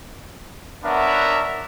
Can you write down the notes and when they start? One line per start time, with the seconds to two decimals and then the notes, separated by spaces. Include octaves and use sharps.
0.84 B3 D4 A#4 C#5 E5 F#5